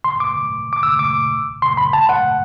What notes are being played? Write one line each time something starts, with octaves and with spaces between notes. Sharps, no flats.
C6
D6
D6
E6
D6
C6
B5
A5
F#5